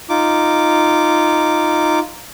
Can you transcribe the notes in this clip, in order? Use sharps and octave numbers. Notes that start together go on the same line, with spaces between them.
D#4 F4 D6